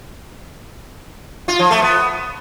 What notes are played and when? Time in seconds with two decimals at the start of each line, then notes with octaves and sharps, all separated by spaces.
1.48 F4
1.59 F3
1.71 A3
1.82 B3